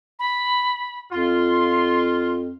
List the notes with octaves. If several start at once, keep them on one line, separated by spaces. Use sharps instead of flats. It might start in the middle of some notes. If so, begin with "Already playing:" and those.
B5
F2 F4 C6